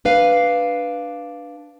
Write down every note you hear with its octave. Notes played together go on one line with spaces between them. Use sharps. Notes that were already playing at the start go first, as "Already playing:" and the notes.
D4 B4 F5